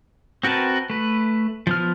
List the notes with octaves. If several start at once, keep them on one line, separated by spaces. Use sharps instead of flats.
C4 F#4 A#4 B4 A5
A3 B4
F3 B3 F6